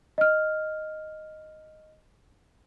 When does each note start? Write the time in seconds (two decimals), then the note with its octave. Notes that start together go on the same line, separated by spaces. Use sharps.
0.18 D#5 F6